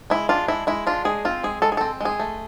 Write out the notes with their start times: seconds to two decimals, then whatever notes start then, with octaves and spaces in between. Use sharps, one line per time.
0.10 G#3 E4
0.29 D4 F4
0.48 G#3 E4
0.67 G#3 E4
0.87 D4 F4
1.05 G#3 G#4
1.25 C4 F4
1.44 G#3 G#4
1.62 G#3 A4
1.72 G#4
1.77 C4 A4
2.01 G#3 G#4
2.20 A3